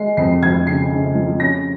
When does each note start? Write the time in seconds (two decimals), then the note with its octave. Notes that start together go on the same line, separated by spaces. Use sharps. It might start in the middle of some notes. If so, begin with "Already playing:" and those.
Already playing: G#3 C7
0.17 F2 C7
0.42 F2 G#6
0.67 C#3 C7
0.91 C#3
1.15 F3
1.40 C#4 A#6